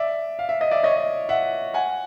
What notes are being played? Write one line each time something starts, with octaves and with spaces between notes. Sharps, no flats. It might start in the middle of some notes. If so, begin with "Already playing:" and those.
Already playing: D5 E5
F5
E5
D#5
D5 E5
C#5 D#5
E5 F#5
F#5 G#5